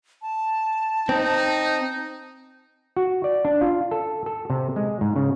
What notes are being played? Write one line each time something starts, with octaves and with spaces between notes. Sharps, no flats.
A5
C4 D#4
F#4
D5
D4
F4
A4
A4
C3
G#3
G#2
C#3